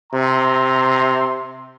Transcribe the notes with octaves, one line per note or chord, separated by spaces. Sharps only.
C3 E5 A#5 C6